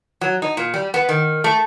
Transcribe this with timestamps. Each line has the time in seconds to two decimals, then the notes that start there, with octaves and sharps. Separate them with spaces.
0.21 F#3
0.42 D#4
0.57 A#2
0.74 G3
0.94 B3
1.09 D#3
1.44 A3